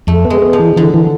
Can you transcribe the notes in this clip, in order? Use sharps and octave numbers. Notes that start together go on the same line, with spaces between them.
F2 A3
B3
G#3
B3
F3
E3
D3 E3
E3